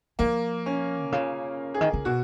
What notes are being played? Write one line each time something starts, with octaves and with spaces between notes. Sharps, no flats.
F3 A#3
C#4
B2
C#3 F4
G#4
D#3
C#3
B2 F#4